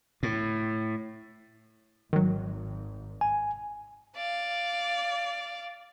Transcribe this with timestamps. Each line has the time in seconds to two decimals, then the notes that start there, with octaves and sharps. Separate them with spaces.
0.23 A2
2.13 G#1 G#2 D#3 F#3
3.21 G#5
4.16 D5 F5